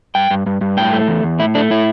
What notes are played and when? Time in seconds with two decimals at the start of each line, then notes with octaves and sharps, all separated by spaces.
0.15 G2 G5
0.30 G2
0.46 G2
0.61 G2
0.77 A2 G5
0.93 A3
1.08 E2
1.23 E2
1.39 A2 E4
1.55 A3 D4
1.71 A2 E4